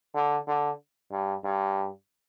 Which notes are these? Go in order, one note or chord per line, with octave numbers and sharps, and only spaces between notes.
D3
D3
G2
G2